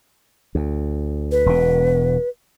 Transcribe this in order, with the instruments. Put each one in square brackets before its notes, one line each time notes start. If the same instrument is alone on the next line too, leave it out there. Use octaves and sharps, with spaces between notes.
[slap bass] D2
[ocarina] B4
[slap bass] E1 B2